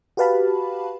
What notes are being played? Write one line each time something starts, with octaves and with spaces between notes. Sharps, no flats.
F#4 G4 B4 F5 A5 B5